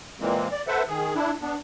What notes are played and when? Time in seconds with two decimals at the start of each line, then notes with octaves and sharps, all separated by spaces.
0.20 A#2 E3 G#3 A#3 C4
0.52 D5
0.68 A4 B4 C5 E5 F#5
0.88 D#3 G#4
1.15 D4 E4
1.42 B3 D4